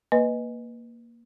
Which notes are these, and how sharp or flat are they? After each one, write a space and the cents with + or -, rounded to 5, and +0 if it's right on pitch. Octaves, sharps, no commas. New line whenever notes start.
A#3 +0 B4 +0 D#5 +0